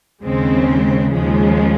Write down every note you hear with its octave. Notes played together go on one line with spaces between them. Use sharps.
D#2 C#3 G#3 C4
D#2 C#3 F3 G#3